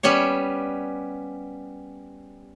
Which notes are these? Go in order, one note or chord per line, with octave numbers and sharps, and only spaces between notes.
G3 B3 C#4 G4 C#5